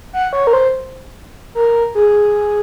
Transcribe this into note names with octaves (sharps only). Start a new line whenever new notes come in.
F#5
C#5
A#4
C5
A#4
G#4